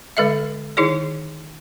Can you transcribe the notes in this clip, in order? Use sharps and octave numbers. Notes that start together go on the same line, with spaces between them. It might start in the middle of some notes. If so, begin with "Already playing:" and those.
D3 G#3 A4 D#5 E5
D#3 D#4 E4 G#4 D5